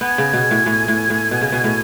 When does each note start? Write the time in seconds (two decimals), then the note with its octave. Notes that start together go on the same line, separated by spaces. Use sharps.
0.01 B3 G#5
0.18 C#3
0.33 B2
0.51 A2
0.66 A2
0.88 A2
1.10 A2
1.31 B2
1.41 C#3
1.52 B2
1.64 A2